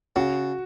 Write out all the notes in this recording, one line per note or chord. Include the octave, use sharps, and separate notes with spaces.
C#3 F#4